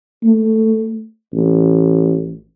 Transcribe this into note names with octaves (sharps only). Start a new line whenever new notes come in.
A3
A1